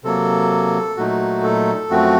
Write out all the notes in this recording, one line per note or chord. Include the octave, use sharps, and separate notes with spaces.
C3 F#3 A#3 A4
A#2 F#3 A3 D#4 F#4
A4
F#2 F3 A3 C4 F#4